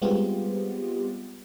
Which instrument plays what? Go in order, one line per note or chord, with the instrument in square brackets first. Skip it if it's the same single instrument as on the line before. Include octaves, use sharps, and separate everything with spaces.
[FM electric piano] G3 G#3 B3 C4 F4 G4